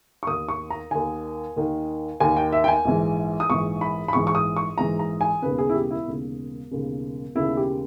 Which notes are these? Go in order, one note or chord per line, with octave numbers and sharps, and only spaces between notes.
C#6
D#2 D#3 D#6
C#6
A#5
D#2 D#3 G#5
D#2 D#3
D#2 D#3 G#5
G5
E5
G5
G#5
A#1 G#2 E3
D#6
A#1 G#2 E3 C#6
B5
B5
A#1 G#2 E3 C#6
C#6
D#6
C#6
A#1 G#2 E3 A#5
A#5
G#5
E1 D#2 C#3 B4
G#4
E4
G4
E4
E1 D#2 C#3
E1 D#2 C#3
E1 D#2 C#3 E4
G4